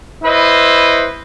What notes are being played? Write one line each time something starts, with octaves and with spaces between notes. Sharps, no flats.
E4 B4 C5 D#5